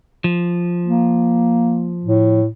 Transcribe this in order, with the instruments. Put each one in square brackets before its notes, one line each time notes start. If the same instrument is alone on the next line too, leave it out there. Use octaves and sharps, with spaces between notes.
[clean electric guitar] F3
[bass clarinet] A#3
A2